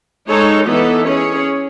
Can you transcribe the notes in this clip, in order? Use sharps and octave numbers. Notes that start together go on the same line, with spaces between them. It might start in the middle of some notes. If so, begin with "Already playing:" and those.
G#3 D#4 A4 C#5
E3 B3 D#4 A4
C#4 G#4 C#5